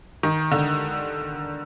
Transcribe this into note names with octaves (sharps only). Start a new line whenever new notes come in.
D#3
D3